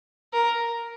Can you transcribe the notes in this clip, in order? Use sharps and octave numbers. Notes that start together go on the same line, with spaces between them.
A#4